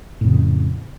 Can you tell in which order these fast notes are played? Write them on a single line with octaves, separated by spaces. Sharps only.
A2 F2 C#3